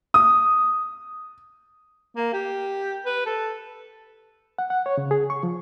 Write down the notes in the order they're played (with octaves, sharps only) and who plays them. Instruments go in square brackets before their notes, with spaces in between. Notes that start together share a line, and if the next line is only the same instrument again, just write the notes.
[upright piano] D#6
[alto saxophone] A#3
G4
B4
A4
[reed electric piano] F#5
F#5
C#5
C#3
G#4
C#6
F3